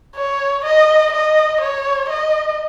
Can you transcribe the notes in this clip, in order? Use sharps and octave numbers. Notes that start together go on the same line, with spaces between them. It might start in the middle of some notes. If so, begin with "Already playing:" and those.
C#5
D#5
D#5
C#5
D#5